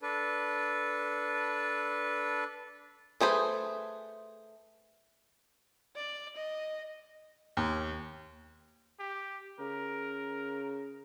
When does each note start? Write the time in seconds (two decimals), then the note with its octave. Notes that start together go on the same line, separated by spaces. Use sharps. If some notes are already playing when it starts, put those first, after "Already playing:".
0.02 D4 A4 B4
3.20 A3 G#4 B4 C5
5.96 D5
6.36 D#5
7.57 D#2
8.99 G4
9.59 C#3 A#4